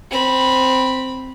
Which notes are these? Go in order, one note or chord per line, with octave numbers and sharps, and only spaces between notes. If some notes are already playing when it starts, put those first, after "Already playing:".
C4 B5